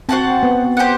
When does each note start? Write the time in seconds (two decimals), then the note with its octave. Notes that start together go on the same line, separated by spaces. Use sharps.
0.09 C4 F#4 C5 F#5 A5
0.43 B3
0.77 G4 C5 F#5